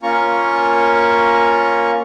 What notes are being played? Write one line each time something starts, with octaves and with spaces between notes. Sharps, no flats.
A#3 C#4 F4 A#5 C#6